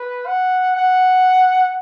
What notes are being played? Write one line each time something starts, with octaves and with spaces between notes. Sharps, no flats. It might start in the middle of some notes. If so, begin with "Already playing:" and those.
Already playing: B4
F#5
F#5